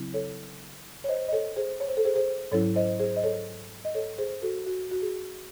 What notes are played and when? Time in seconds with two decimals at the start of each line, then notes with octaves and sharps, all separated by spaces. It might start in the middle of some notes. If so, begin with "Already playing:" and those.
Already playing: C#3 F#3 C4 E4
0.14 A4 C#5
1.04 C#5
1.08 C5 D#5
1.28 D#5
1.32 A4 C#5
1.56 G#4 C5
1.80 C#5
1.88 C5
1.97 A4
2.05 G#4 C5
2.16 G#4 C5
2.52 G#2 F#3 C#4 E4 A4 C#5
2.76 C5 D#5
3.00 G#4 C5
3.16 D#5
3.23 A4 C#5
3.85 D#5
3.94 A4 C#5
4.18 G#4 C5
4.42 F#4 A4
4.66 F#4
4.91 F#4
5.02 G#4